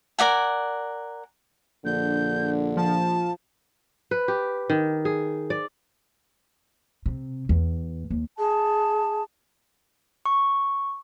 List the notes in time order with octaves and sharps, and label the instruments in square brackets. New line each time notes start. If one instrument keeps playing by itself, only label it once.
[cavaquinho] A#4 D5 F#5 G#5
[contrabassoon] A#1 [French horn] D3 [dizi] G6
[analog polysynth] F3 [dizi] A5
[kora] B4
G4
D#3
G#4
D5
[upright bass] C3
E2
D#2
[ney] G#4 [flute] A5
[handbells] C#6